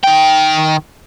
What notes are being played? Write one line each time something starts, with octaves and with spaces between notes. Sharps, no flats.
D#3 G5